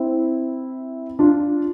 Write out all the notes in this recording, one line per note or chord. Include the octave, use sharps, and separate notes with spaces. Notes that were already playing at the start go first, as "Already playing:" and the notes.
Already playing: C4 E4
D4 F4